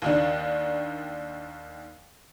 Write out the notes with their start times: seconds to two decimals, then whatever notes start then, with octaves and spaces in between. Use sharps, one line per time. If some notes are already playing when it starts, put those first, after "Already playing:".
0.02 D#2 D#3 D4